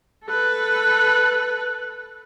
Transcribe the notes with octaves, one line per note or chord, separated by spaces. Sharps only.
A4 B4